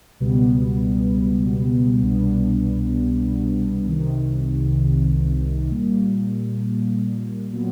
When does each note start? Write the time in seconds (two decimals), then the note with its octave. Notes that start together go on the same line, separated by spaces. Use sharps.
0.20 C#2 B2 G3 B3
2.03 C2 B2 G3 B3 D4
3.86 C2 C3 D#3
5.69 A#2 G3 A#3
7.53 A#2 F#3 B3